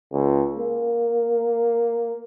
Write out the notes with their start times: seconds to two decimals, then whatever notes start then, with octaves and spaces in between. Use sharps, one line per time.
0.13 C#2
0.59 A#3